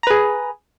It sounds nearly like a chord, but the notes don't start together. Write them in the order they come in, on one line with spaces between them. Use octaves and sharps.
A#5 B4 G#4